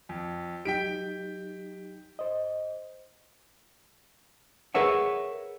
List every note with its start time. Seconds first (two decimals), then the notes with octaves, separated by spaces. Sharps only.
0.09 F2
0.65 F#3 D#4 G4 G5 B6 D7
2.19 C5 D#5
4.74 G#4 A#4 B4 C#5 E5 F#5